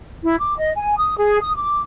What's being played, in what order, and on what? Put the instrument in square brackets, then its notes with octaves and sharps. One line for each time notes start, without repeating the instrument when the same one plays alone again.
[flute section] E4
D6
D#5
G#5
D#6
G#4
D#6
D6